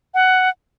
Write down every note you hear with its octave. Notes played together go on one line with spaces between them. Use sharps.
F#5